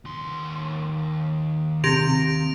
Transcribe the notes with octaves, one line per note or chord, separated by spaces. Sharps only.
D#2 C6
C3 A#6 D7 F7